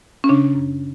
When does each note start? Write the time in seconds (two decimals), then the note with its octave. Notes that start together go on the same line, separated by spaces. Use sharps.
0.24 C#4
0.29 C#3 D4
0.55 F#2